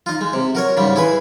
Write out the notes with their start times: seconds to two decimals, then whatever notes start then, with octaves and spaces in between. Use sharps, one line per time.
0.06 D#4 F4
0.21 G#3
0.33 C3
0.55 F#4 A#4 C#5
0.77 G#2 C#3 G3
0.96 E4 G#4 B4